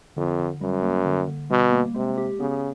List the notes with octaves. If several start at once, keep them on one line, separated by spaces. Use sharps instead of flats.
F2 D3
D3
F#2 G3
A#3
D3
D3
B2 G3
A#3
C3 G#3
G4
C#3 B3